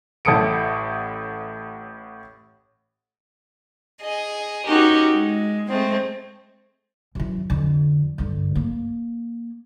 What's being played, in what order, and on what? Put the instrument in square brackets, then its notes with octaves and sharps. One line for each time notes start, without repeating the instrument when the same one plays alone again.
[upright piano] A1 A2 A4 D#6 C#7 D7
[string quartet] G#4 D#5
C#4 D#4 F#4 G4 A#4
G#3
G#3 A3 C4
[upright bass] F#2 E3
F2 D3
G2 D3
A#3